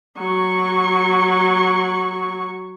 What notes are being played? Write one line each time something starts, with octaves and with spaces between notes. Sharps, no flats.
F#3 C#6